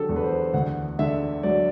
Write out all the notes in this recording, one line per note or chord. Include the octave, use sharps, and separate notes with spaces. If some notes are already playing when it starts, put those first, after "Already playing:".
Already playing: D3 F#3 G4 A4
E2
B4
C5
D2 F#5
D3 E5
F#3 D5